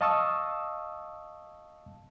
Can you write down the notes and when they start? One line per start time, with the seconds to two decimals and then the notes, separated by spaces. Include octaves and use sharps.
0.01 D#5 F5 A5 C#6 D#6 E6